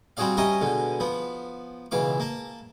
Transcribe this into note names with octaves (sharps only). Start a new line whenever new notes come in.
G3 C4 F#4 G#4 D5 F5
G3 C#4 A#4 D#5 E5
B2 D3 G#3
F3 B3
C#2 B2 E3 F5 D6
A#3 A5